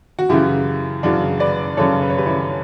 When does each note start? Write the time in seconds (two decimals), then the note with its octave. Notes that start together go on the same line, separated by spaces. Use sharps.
0.19 F#4
0.29 F#2 C#3 E3 E4 G4
1.03 F#2 C#3 E3 D4 F#4
1.40 B4 D5
1.77 F#2 C#3 E3 A4 C#5
2.02 B4
2.10 C#5
2.18 G4 B4
2.26 C#4 E4